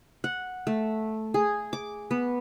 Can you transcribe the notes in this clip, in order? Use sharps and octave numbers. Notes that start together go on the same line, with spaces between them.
F#5
A3
G#4
D6
B3